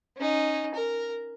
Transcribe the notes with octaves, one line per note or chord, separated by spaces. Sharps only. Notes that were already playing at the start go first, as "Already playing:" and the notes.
C#4 D#4
A#4